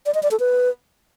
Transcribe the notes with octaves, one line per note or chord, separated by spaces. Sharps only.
D5
D#5
D5
A4
B4